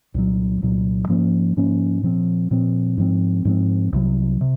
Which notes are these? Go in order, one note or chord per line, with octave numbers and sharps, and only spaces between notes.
C2 A#2 F#3
C2 A#2 F#3
G#2 F3 A#3 C#4
G#2 F3 A#3 C#4
A#2 F3 C4
A#2 F3 C4
G#2 F3 C4
G#2 F3 C4
C2 C3 D#3 F#3
C3